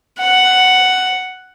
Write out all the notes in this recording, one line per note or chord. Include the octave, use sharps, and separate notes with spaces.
F#5